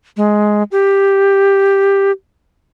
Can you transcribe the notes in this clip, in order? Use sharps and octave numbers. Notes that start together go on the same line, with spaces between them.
G#3
G4